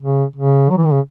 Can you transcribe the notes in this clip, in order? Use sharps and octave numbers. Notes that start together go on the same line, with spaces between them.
C#3
C#3
F#3
E3
D#3
C#3